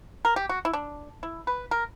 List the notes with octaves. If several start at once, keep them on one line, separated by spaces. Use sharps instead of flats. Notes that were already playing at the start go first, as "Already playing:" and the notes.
A#4
G4
F#4
E4
D4
E4
B4
A#4